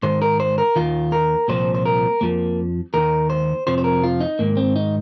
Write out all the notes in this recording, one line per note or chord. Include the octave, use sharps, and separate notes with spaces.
G#2 D#3 C5
A#4
C5
A#4
D#2 D#3 F4
A#4
C2 A#2 F3 C5
C5
A#4
F2 F3 A#3
D#2 D#3 A#4
C5
F2 C3 F3 C5
C5
A#4
F4
D#4
G#2 D#3 A#3
C4
D#4